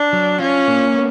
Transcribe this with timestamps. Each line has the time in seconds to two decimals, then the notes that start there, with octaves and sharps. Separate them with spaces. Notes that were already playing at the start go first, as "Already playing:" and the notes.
Already playing: D4
0.13 F#3
0.40 C#4 F4
0.68 A#3
0.94 B3